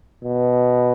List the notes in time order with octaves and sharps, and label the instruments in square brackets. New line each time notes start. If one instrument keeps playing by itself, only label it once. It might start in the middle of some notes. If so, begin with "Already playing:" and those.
[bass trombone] B2